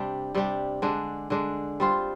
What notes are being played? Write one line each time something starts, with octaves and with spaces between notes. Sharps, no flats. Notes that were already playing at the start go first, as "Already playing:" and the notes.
Already playing: C3 G3 D4 G4
C3 G3 D4 G4
D3 G#3 D4
D3 G#3 D4
G3 C4 F4 C5